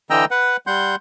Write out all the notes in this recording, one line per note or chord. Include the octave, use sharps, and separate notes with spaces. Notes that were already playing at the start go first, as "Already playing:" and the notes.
D3 E3 D#5 G5 A#5 E6
B4 F#5
G3 F#5 C6 G6